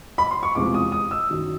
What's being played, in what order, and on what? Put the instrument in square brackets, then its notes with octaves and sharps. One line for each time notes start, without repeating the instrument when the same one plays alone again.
[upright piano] B5
C6
C#6
E2 C3 F3 G#3 D6
D#6
D#6
E6
F#2 D#3 F#3